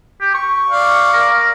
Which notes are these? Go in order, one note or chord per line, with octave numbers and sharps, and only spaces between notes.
G4
C#6
D5 F5
A#4